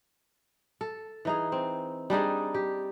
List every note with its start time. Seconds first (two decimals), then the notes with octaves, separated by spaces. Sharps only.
0.81 A4
1.25 E3 D#4 G#4
1.52 C4
2.10 G3 D4 D#4 G#4
2.54 G4